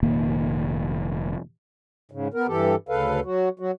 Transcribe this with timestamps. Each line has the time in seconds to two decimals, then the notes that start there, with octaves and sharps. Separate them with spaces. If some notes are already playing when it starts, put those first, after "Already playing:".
0.03 F1 A#2 D#3 A#3
2.12 G#2 C#3
2.34 B3 A#4
2.48 G2 E3 G4 A4
2.89 D2 C#3 A4 B4 F5
3.25 F#3 F#4
3.60 F#3 F#4